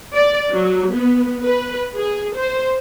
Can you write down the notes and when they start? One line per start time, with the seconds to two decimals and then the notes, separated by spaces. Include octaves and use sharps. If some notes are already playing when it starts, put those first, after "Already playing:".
0.15 D5
0.53 F#3
0.95 B3
1.44 B4
1.98 G#4
2.37 C5